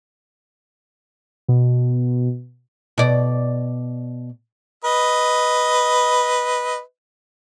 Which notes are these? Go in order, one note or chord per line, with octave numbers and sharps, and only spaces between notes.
B2
B2 D5
B4 D#5